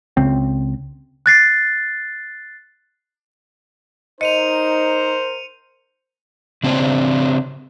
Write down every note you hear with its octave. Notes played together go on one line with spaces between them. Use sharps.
C#2 C#3 C4
F#6 A6 C7
D#4 A#4 C5 D#5 C#7 D#7 F7
C#3 C4 D4 E4 C5 C#5